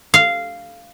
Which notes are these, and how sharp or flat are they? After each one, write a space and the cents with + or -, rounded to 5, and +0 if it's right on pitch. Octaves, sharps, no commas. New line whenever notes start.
F5 -10